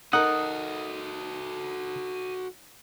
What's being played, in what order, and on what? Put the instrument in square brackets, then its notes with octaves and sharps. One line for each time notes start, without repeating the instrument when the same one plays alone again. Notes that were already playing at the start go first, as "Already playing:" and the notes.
[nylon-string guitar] D#4 A#4 [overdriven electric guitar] F#4 A4 [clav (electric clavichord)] F#5 [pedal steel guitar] D#6